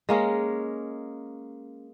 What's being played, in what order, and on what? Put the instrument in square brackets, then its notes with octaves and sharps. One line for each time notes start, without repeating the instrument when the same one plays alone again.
[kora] G#3 A#3 C#4